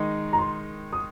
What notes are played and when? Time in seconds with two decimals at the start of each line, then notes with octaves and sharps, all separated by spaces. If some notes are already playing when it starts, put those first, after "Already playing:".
Already playing: D#3 G#3 D#4
0.33 A#5
0.39 C6
0.93 D#6